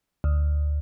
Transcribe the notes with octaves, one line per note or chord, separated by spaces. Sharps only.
D2